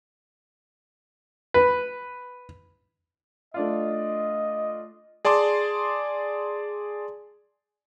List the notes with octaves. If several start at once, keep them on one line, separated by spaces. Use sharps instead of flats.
B4
A3 D4 F4 D#5
G#4 D5 A5 C6 D6